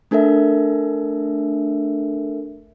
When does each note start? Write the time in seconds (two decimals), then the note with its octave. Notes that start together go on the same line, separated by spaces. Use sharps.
0.11 A3 D4 A4 A#4 E5